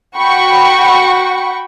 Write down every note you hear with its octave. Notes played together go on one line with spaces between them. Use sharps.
F#4 F#5 G5 B5 C#6